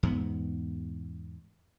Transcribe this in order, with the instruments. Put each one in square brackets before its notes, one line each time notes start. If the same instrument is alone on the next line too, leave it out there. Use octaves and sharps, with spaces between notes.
[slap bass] E2 G#2 B3